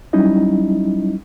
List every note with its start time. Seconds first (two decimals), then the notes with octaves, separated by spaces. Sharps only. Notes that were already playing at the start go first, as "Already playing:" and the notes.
0.13 F#3 G3 C#4 D#4 E4 D#5